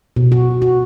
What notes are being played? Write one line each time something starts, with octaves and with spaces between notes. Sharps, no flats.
B2
F#4
F#4